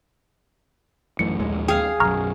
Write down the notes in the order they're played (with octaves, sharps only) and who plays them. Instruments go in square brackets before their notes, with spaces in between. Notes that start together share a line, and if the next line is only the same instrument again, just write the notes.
[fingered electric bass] A1 F#2 A2 [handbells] C#7
[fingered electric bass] A#1 D#2 G#3
[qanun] G#4 F5 [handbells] G5
[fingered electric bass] B1 F#2 [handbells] A#5 C#6 F6